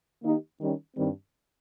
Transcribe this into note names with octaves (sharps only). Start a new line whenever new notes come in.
D#3 A#3 D#4 G4
D#3 G3 C#4
G2 D#3 G3 C4